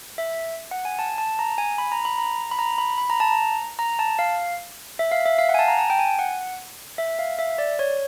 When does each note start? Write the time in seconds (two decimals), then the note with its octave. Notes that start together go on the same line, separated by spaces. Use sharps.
0.18 E5
0.71 F#5
0.85 G#5
0.99 A5
1.18 A5
1.39 A#5
1.58 G#5
1.78 B5
1.92 A#5
2.05 B5
2.18 A#5
2.51 B5
2.59 A#5
2.78 B5
2.98 B5
3.10 A#5
3.20 A5
3.31 A#5
3.79 A#5
3.99 A5
4.19 F5
4.99 E5
5.12 F5
5.26 E5
5.39 F5
5.49 F#5
5.54 G#5
5.59 A5
5.68 A#5
5.79 A5
5.90 G5
5.99 G#5
6.19 F#5
6.98 E5
7.19 F5
7.39 E5
7.58 D5
7.79 C#5